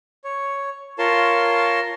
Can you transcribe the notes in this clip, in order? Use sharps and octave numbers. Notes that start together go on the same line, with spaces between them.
C#5
F4 A#4 C#5 A5 C6